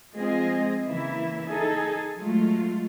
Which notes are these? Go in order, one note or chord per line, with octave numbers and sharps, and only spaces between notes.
F3 G#3 C4 F4 G#4 D#5
C#3 E3 A#3 E4 E5
D#4 G#4 A4
F#3 G#3 A3 F4